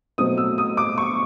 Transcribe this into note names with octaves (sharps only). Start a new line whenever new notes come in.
B2 F#3 A3 C4 D#6
E6
D#6
D6
C#6